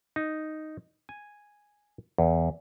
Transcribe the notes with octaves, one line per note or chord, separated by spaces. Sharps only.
D#4
G#5
E2